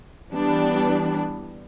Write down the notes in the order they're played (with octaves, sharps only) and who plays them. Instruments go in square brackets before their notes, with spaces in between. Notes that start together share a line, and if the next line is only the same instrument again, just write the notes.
[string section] E3 G3 B3 D4